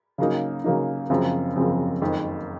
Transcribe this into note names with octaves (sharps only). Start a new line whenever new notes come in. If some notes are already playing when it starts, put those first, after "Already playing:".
C#3 F#3 A#3 D#4
C#3 F#3 A#3 D#4
F#1 F#2 C#3 F3 C4
F#1 F#2 C#3 F3 C4
F#1 F2 D#3